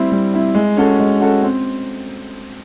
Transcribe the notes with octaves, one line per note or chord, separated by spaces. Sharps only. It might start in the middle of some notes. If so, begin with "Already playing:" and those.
Already playing: G3 C4 E4
G3
C4 E4
G#3
C#4 F#4 A4
G#3
C#4 F#4 A4
C4